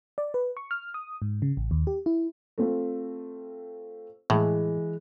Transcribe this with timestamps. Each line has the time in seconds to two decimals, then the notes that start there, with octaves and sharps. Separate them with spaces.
0.18 D5
0.34 B4
0.57 C#6
0.71 F6
0.94 D#6
1.22 G#2
1.42 C#3
1.57 A1
1.71 D#2
1.87 G4
2.06 E4
2.58 A3 C4 F4
4.30 A2 E3 G#3